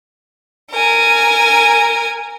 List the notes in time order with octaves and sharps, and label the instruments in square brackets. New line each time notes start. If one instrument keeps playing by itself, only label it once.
[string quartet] A#4 G#5